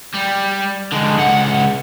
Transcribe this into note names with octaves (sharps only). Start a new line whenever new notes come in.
G3
D3 G#3
C#2 F#5